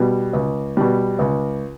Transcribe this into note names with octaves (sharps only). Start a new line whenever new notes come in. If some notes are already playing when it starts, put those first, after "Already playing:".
Already playing: B2 G3
C#2
B2 G3
C#2